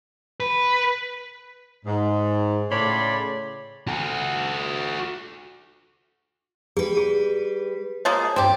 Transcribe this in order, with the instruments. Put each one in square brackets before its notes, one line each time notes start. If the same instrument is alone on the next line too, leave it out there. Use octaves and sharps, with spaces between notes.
[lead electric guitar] B4
[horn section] G#2
A2 C#3 C#5 D5 B5 C6
[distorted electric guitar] F#4 A4
[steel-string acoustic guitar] G3 B4 [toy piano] G#4
[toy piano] G#4
[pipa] F3 G#3 A#3 [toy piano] C#5
[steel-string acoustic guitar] D2 G2 [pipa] C4 G4